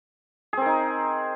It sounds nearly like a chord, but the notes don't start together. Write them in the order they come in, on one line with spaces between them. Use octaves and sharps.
G#4 C4 A#4 D#4